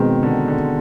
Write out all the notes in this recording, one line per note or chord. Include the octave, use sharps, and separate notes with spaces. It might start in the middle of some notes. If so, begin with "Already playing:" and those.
Already playing: B2 D#3 G#3 C4
D3
D3